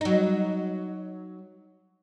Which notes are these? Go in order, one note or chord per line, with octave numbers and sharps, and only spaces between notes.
F#3 D#4